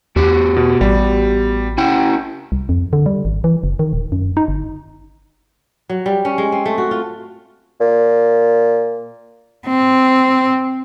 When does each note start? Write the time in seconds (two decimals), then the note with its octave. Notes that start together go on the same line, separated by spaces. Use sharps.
0.16 E2 B3 F#4 G4
0.56 B2
0.81 A1 G3
1.78 C#4 E4 F#5 G5
2.52 C2
2.69 F2
2.93 D3
3.06 G3
3.25 G#1
3.44 E3
3.64 F#1
3.79 D#3
3.93 D#1
4.12 F#2
4.37 D#4
4.48 G1
5.89 F#3
6.06 G3
6.25 C#4
6.38 G#3
6.52 C4
6.66 A3
6.78 F#4
6.91 F4
7.81 A#2
9.67 C4